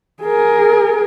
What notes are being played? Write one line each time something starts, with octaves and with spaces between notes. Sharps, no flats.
G#4 A#4